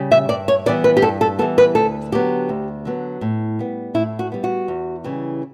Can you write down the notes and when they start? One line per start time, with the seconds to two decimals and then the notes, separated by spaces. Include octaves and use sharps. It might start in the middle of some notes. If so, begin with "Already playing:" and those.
Already playing: C#3 G3
0.12 E5
0.29 G2 D5
0.48 C#5
0.66 E3 G3 B3 D5
0.84 B4
0.97 G4
1.02 G2 A4
1.21 A4
1.39 E3 G3 B3 A4
1.58 B4
1.75 D2 A4
2.12 D3 F#3 B3 G4
2.49 D2
2.85 D3 F#3 B3
3.21 A2
3.59 G3 B3
3.94 A2 E4
4.19 F#4
4.32 G3 B3
4.44 F#4
4.68 E2
5.04 C#3 E3 G3